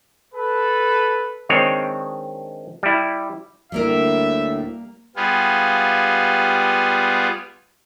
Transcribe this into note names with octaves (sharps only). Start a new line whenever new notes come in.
A4 B4
D#3 G#3 C4 D4 C#5
G3 E4
D2 A2 G3 A#3 A#4 E5
G3 B3 F4 G#4